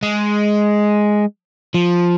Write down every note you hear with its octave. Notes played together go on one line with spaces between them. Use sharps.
G#3
F3